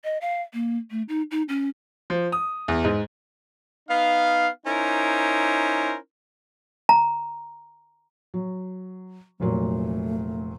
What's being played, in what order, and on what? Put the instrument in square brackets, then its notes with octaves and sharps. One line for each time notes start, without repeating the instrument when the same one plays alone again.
[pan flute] D#5
F5
A#3
A3
D#4
D#4
C#4
[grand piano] F3
D#6
E2
G#2
[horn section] B3 D#4 F5
C#4 D#4 E4 A#4 C5
[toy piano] A#5
[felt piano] F#3
[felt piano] F1 A#2 F#3 [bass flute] A3